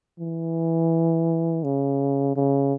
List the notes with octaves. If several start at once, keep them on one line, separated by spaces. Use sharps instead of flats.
E3
C#3
C#3